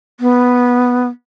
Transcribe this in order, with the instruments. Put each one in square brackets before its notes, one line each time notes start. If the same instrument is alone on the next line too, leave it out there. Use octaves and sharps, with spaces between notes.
[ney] B3